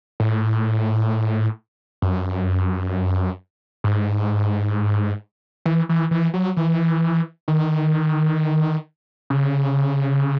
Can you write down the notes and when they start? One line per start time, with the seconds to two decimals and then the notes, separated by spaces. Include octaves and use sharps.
0.20 A2
2.02 F#2
3.84 G#2
5.66 E3
5.89 E3
6.11 E3
6.34 F#3
6.57 E3
7.48 D#3
9.30 C#3